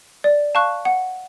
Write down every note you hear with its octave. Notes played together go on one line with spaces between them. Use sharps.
D5
F5 A5 C#6 F#6
F#5